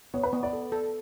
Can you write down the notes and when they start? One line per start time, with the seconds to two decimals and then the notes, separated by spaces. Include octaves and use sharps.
0.14 B3 C#5
0.23 B4
0.33 B3
0.43 D5
0.53 A4
0.72 A4